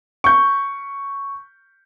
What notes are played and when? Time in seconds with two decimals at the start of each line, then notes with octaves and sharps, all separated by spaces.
0.24 C#6 G6